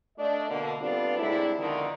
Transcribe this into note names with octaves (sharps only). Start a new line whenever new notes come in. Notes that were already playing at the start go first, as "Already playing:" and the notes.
A3 D4 D#5
B2 D3 A#3
G3 B3 C4 D4 F4 A4
A2 C3 G#3 D4 E4
F2 B2 D3 D#3